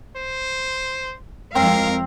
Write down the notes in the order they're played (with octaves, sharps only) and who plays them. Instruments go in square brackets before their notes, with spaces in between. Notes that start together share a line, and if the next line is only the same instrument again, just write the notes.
[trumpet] C5
[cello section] F2 G#3 F5 [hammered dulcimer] C4 [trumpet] A#4